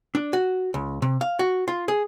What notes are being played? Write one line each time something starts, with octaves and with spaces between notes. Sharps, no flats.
D4
F#4
C#2
C3
F5
F#4
F4
G#4